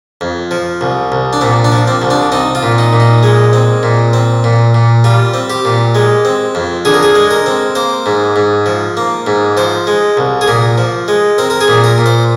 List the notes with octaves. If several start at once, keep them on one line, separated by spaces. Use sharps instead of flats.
F2
F3
C2
C2
D4
A#2 C4
D4
F3
C4
C2
D4
C4 D#4
F4
A#2
D#4
A#2
D#4
G#3
C4
A#2
C4
A#2
A#2
G3 F4
C4
G4
A#2
G#3
C4
F2
D3 G#4
A#4
G#4
G#3
A#4
C4
A#3 C5
G#2
G#2
F3
A#3
G#2
F3 C5
G#3
C2
G#4
A#2 A#4
F3
G#3
C4 A#4
A#4
G#4
A#2
A#4
A#2
C5